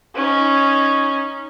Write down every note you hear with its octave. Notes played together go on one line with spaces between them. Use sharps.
C#4 D#4